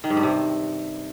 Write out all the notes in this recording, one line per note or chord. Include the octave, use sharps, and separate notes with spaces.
D#3
G#2
G2
C3